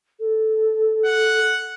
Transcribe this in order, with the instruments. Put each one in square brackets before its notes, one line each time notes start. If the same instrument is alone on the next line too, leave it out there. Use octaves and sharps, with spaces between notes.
[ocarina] A4
[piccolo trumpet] F#5